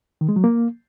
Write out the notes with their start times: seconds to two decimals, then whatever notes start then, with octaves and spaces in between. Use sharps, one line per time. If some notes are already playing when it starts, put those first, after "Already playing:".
0.21 D#3
0.29 G#3
0.36 F#3
0.44 A#3